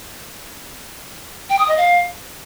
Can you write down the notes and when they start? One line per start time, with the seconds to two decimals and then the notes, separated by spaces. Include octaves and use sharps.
1.50 G5
1.59 D#6
1.68 D#5
1.77 F5